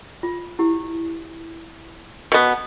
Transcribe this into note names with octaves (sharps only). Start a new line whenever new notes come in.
F4
E4 G4
B2 B3